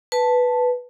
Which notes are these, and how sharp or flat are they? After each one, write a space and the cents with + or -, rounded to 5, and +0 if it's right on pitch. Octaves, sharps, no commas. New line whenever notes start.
B4 +0 A5 +0